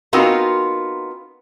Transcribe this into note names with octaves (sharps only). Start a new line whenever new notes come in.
B3 C4 D#4 F4 F#4 A#4